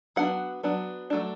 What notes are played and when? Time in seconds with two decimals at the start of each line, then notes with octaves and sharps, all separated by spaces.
0.16 F#3 B3 D4 F#5
0.63 F#3 B3 D4
1.10 F#3 A3 D4